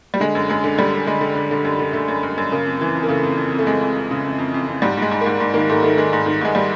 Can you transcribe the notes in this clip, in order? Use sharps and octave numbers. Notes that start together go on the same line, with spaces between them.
G3
D3 G#3
F#2
F#2 G#3
D3
D3 G3
F#2
D3 G#3
D3
D3
D3
F#2
D3
D3 A3
F#2
F#2
F#2
C#3 A#3
F2
E3
F2
A#3
C#3 A3
F2
F2
F2
A3
F2 G#3
F2
F2
C#3
F2
F2
F2
F2
G#2 G3
G#2 G#3
G#2
A#3
G#2
G#2
D#3 A#3
G#2 A3
D#3 A3
D#3 G#3
G#2
D#3
G#2 G#3
G3